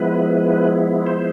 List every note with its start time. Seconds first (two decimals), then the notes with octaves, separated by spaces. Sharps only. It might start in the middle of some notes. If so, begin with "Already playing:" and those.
Already playing: F3 G#3 B3 E4 B4
1.07 C5